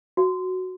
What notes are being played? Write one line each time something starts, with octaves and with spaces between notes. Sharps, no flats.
F#4